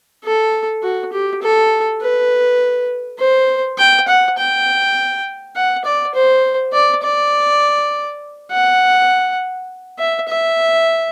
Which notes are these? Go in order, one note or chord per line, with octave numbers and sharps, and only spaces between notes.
A4
F#4
G4
A4
B4
C5
G5
F#5
G5
F#5
D5
C5
D5
D5
F#5
E5
E5